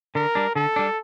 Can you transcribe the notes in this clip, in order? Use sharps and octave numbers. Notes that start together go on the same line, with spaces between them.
D3 A#4
G3 D4
D3 A4
G3 D4